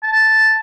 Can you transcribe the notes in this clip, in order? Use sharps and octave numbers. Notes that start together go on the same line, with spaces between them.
A5